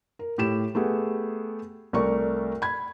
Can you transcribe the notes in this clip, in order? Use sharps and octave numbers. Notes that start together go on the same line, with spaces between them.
A#4
A2 G4 E7
A3 B3 G4 G#4
C2 A3 A#4 D5 C#6
B5 G#6